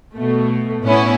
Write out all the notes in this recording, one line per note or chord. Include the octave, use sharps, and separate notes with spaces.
B2 A3
A2 B3 C#4 E4